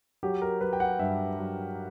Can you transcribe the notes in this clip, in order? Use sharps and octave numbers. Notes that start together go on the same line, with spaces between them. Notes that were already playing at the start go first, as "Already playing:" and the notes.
F#3 G4
A#4
F#3 B4
G5
F#5
G2 E5
F#3